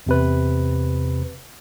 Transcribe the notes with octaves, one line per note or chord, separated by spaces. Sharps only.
E2 C3 B4